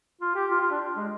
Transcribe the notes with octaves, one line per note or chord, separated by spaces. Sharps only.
F4
G4
F4
F4
D4
G#3